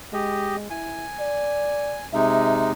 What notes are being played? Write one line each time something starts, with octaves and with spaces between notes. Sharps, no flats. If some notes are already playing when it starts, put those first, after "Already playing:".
G#3 G4 D#5
E4 G#5
D5
C3 G#3 D#4 E5